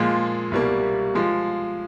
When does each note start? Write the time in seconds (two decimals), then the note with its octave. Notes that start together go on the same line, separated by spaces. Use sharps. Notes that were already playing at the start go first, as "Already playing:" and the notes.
Already playing: A#2 F3 G#3
0.52 C2 B2 G3 A#3
1.15 F3 G#3